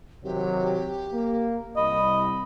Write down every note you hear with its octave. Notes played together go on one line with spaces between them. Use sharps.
C3 D#3 F#3 G4
A#3
C2 D#5 B5